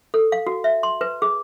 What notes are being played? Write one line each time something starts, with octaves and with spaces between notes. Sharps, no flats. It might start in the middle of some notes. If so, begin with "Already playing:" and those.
A4
F5
F#4
E5
C6
B4
G#4